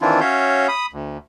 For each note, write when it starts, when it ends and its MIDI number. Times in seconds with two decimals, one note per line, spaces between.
0.01 0.20 51
0.01 0.20 52
0.01 0.20 60
0.01 0.20 62
0.01 0.20 64
0.01 0.20 65
0.21 0.67 61
0.21 0.67 66
0.21 0.67 73
0.21 0.67 76
0.21 0.67 77
0.21 0.67 91
0.68 0.86 83
0.68 0.86 87
0.93 1.17 38